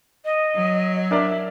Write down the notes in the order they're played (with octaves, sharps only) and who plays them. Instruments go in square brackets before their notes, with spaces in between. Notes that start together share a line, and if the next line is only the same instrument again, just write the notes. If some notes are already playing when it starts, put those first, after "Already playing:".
[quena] D#5
[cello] F#3
[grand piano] D4 A#4 D5 [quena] E5